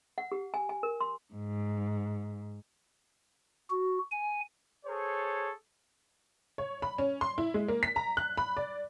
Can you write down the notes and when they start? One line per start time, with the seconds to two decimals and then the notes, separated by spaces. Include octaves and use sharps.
0.18 F#5
0.32 G4
0.54 G#5
0.69 G#5
0.83 A#4
1.00 C6
1.33 G#2
3.70 F#4
4.12 G#5
4.86 G#4 A4 C5 C#5
6.58 C#5
6.82 B5
6.98 C#4
7.21 C6
7.38 E4
7.54 G#3
7.68 A#3
7.83 B6
7.96 A#5
8.17 F#6
8.37 B5
8.57 D5